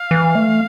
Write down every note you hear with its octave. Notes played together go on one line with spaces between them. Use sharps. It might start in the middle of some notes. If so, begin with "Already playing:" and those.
Already playing: F5
E3
A3